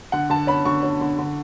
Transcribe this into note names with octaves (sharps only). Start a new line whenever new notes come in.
D3 F#5
D3 A5
C#4 B5
D3 C#6
C#4
D3
D3